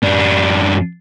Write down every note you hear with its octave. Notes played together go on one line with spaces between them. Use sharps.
F#2 D4